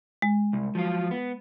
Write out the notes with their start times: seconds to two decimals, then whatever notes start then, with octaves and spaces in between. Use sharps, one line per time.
0.22 G#3
0.53 C2
0.75 F3 F#3 F4
1.11 B3